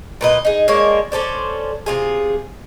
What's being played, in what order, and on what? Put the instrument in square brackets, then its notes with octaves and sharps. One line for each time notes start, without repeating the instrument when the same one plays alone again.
[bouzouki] A#2 B4 D#5
D#4 G#4
G#3 A#3 D4 C#5
C#4 A4 C5 D5
C3 F4 G#4